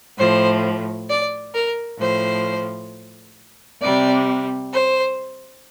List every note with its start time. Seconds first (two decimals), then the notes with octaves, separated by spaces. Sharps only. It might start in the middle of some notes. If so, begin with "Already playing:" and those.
0.17 A2 F3 C5
1.09 D5
1.54 A#4
1.99 A2 F3 C5
3.81 C3 G3 D5
4.72 C5